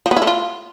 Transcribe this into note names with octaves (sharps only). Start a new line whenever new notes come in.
F3
B3
E4
A3
F4